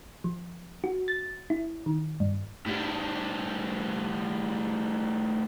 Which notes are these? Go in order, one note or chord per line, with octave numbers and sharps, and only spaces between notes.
F3
F#4
A6
E4
D#3
G2
A2 G3